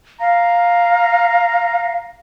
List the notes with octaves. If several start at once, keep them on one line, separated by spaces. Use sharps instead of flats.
F5 A#5